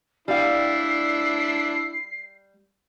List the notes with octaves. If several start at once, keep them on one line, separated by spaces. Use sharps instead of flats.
G3 D4 E4 F5 C7